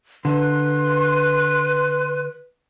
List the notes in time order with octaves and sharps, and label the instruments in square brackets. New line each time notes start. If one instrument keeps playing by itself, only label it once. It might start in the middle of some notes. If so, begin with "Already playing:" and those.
[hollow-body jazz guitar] D3 [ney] B4 [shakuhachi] C6